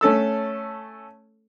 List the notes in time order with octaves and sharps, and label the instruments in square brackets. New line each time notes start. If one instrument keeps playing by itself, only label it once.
[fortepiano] A3 C#4 A4 E6